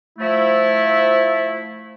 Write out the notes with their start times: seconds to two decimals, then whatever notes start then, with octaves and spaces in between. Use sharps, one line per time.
0.19 F3 A3 E4